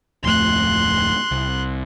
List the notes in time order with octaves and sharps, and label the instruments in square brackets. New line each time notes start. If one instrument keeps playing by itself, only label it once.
[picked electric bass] D1 F2 A3 [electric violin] C6 F#6
[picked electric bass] C2